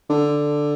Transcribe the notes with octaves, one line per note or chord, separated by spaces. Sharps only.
D3